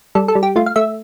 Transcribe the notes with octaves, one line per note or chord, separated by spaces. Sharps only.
G3 A4
A4
G3
G4
A3 F4
F5
A3 E5